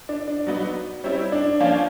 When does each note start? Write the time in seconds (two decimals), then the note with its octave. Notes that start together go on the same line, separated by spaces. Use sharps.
0.09 D4
0.28 D4
0.47 F#3 B3 D#4
1.04 G3 C4 C#4 E4
1.32 D4
1.60 F3 A#3 C#4 F4